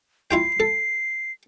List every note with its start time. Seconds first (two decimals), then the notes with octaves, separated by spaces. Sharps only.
0.31 E4 F4 G5 C7
0.60 A4